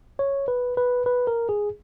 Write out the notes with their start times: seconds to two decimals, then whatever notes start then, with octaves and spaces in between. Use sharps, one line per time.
0.19 C#5
0.48 B4
0.77 B4
1.06 B4
1.27 A#4
1.49 G#4